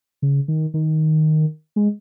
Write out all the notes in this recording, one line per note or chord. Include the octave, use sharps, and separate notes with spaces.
C#3
D#3
D#3
G#3